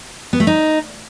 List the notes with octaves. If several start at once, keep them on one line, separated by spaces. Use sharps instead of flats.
B3
A3
D#4